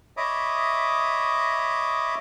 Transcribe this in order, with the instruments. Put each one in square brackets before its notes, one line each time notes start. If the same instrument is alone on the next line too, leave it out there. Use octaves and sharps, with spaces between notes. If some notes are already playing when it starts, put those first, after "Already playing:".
[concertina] C#5 D#5 E5 B5 D6 D#6